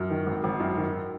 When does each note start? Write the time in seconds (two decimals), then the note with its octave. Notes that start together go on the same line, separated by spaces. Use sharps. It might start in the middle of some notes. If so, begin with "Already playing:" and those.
Already playing: F#2
0.10 D#3
0.27 G#1
0.44 G#1
0.60 F#2
0.77 D#3